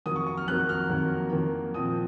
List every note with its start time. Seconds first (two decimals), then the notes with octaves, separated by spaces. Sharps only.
0.06 F2 D#3 F#3 A#3 D#6
0.16 C#6
0.27 C#6
0.37 F6
0.48 F2 D#3 F#3 A#3 F#6
0.69 F6
0.90 F2 D#3 F#3 A#3
1.32 F2 D#3 F#3 A#3
1.74 A#2 F3 C4 D#6